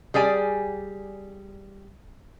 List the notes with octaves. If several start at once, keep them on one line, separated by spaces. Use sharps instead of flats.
G3 G#4 D5 G#5